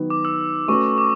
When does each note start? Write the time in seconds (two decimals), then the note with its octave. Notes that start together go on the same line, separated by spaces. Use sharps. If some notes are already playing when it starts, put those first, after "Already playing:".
Already playing: D#3 F#3 B3
0.10 D6
0.25 E6
0.68 A3 C#4 F#4 B4 C#6
0.98 D6